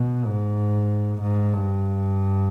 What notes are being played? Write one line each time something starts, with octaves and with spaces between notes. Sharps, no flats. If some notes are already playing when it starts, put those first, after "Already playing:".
Already playing: B2
G#2
G#2
G2